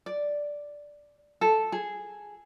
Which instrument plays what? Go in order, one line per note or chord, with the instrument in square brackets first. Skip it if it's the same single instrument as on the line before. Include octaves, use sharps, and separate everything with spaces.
[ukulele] D5
A4
G#4